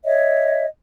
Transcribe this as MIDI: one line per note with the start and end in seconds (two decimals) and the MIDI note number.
0.03 0.65 73
0.03 0.65 75
0.03 0.65 76